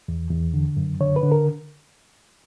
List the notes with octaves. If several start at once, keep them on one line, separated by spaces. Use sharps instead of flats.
E2
E2
D3
F#2
D3 C#5
B4
D3
A#4